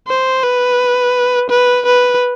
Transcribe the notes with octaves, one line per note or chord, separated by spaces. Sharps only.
C5
B4
B4
B4